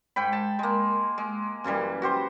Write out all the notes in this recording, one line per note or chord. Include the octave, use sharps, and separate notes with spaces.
G#2 G5 B5
A5
G#3 A#3
G#3
F#2 C#3 E3 G3
F#4 G4 C5